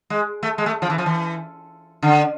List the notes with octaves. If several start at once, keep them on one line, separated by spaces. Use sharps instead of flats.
G#3
A3
G#3
A3
F3
E3
F3
E3
D3